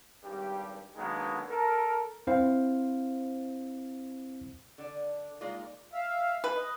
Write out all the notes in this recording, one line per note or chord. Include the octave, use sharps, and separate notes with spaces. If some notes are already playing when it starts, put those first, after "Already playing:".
G#1 G2 G3 G4
D3 D#3 F#3 G#3 A#3 B3
A4 A#4
C4 E4 C5 F5
D3 D5
G#3 A#3 D#4 F4 D5
E5 F5
B4
D#5